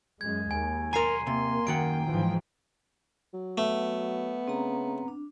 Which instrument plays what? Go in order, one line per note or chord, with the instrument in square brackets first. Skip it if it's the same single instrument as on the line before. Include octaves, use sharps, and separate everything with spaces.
[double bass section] F#2 G#3 [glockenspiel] G#6
[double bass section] D#2 [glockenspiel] G#5
[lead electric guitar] B1 C6 [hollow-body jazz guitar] A#4 G#5 [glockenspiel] A#5 C7 D#7
[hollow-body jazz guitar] C3 [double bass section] A#3 [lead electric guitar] C6
[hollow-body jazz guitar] F#2 D#3 F#5 [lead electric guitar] G5 [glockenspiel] D7
[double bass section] G#2 E3 F3
[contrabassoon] F#3
[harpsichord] A3 [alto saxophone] B3
[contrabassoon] C#3 [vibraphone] C4 A#5
[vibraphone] D4